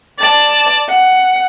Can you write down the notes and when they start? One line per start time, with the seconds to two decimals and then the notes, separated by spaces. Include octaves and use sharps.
0.18 D5 A5
0.88 F#5